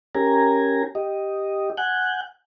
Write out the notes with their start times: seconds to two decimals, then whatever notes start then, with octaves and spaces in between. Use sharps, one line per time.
0.15 C#4 G4 A#4 G#5 A#5
0.95 G4 D#5
1.77 F#5 G#5 F#6 G6